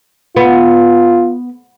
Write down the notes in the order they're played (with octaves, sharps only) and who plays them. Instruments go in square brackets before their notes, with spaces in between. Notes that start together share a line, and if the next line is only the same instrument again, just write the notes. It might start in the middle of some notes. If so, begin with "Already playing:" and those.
[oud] B3 [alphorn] F4